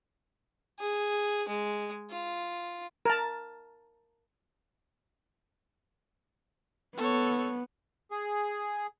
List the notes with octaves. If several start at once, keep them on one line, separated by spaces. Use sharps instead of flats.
G#4
G#3
F4
A#4 A5
B3 A4 C#5
G#4